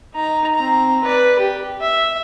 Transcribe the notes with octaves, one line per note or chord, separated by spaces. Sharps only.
D#4 A#5
C4 A#5
B4 D5
G4
E5